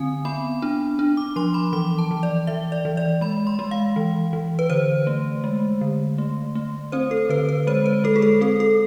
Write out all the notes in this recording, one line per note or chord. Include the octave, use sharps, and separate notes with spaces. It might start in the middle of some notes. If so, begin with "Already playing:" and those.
Already playing: D3 C4 G#5
B3 B5
D4
D4
D6
F3 C6
B5
E3 D6
A5
E3
D5
E3 E5
D5
E3
D5
G#3 B5
C6
G#3
F5
E3
E3
B4
D3 C5
A3
G#3
D3
A3
A3
C4 C5
A4
D3 B4
B4
G#3 C5
B4
G#3 A4
G#4
A4
C4 A4
A4